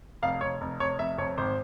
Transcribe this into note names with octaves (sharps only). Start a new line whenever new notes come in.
F1 F5
F1 C#5
F1
F1 C#5
F1 E5
F2 C#5
G#1 C5